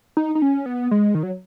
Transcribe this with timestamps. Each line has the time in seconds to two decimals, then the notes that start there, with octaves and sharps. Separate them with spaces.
0.17 D#4
0.35 D#4
0.42 C#4
0.66 B3
0.91 G#3
1.15 D#3
1.23 F#3